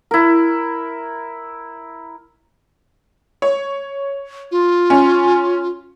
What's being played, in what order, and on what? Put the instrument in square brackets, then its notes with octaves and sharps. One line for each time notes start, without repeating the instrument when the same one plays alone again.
[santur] E4 A#4
[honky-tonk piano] C#5
[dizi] F4
[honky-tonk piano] C#4